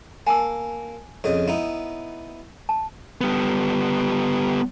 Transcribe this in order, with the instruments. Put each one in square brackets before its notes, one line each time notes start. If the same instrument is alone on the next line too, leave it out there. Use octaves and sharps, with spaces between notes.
[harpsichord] A#3 [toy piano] G#5 A5 E6
[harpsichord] F2 C#3 D#5 [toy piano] C#5
[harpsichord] B3 D#4 E4
[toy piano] A5
[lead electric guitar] G3 B3